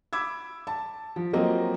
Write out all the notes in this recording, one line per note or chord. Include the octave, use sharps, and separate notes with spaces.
B5 D6 E6 G#6
A5
F3
F3 F#3 A#3 C4 D#5